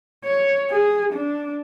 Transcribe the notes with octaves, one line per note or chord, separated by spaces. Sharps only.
C#5
G#4
D4